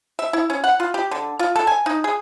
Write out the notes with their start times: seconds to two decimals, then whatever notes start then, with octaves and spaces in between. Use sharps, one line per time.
0.19 E5
0.33 E4
0.50 C#4
0.64 F#5
0.80 F4
0.94 G4
1.11 D3
1.39 F4
1.56 A4
1.67 G#5
1.86 D#4
2.04 G#4